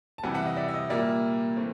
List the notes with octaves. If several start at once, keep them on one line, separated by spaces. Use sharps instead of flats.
A5
C3 E3 G3 F#5 G#5
E5 F#5
D#5
D5 E5
E5
D#5
A#2 G3 A#3 D5 E5
E3 A3 C4